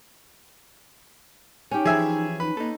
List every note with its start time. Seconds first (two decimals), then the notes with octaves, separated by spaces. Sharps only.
1.71 C#4 D#4 G4
1.85 E3 F3 G#4 E5 G#5
2.40 D#4 B4
2.57 A#3 D#4 A4